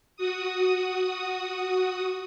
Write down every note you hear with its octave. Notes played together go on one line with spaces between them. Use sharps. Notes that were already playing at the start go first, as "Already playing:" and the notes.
F#4 D#6